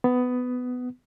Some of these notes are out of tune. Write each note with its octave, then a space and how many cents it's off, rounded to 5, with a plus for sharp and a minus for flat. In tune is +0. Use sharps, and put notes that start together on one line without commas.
B3 +15